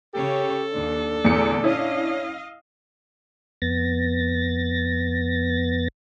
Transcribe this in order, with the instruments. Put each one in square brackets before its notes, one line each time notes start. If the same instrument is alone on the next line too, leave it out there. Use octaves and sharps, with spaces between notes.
[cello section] C#3 C#5 [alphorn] G4 [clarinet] A4
[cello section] D#2 [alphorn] D4
[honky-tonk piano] E2 C#7 [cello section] A#2 D3 A3
[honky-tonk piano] C#4 E4 [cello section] D#5 F5
[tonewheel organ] F2 B3 A6 A#6